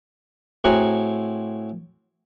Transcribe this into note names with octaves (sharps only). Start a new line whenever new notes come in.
A2 C4 F#4 G#4 F#5 A#5